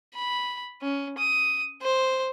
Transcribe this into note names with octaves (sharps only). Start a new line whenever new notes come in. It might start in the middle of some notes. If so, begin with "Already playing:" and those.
B5
C#4
D#6
C5